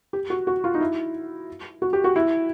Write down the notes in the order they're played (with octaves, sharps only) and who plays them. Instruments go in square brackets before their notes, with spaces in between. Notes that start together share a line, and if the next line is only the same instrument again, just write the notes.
[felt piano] G4
F#4
F#4
F4
D#4
E4
F#4
G4
F#4
E4